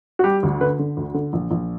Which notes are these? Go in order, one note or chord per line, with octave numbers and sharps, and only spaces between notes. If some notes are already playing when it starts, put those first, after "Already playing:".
F#4
G3 G4
D2
D3 B4
D3
D2
D3
A#1
A#1